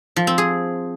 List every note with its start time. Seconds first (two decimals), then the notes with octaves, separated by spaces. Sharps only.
0.16 F3
0.27 C4
0.38 G#4